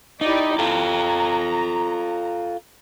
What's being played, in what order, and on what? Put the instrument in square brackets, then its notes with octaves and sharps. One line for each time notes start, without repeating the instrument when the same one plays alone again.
[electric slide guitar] D#4 [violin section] E4 G4 D5
[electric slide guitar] F4 A4 [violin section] A#5